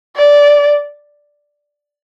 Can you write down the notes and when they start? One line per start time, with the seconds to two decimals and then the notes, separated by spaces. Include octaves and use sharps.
0.16 D5